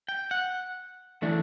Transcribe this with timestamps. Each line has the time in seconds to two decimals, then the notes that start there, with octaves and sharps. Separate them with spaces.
0.09 G5
0.31 F#5
1.22 E3 A3 D4